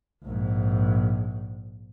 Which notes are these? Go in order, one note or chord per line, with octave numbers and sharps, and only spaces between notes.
A#1 G#2